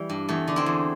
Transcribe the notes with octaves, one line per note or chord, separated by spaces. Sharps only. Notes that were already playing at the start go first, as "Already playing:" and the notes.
Already playing: E3 G3
G2
E2 A3
D3
C4 E4
E2